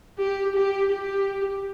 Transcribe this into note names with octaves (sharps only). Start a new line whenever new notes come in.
G4
G4
G4